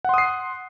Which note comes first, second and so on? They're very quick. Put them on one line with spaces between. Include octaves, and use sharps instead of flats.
F#5 C6 D#6 C7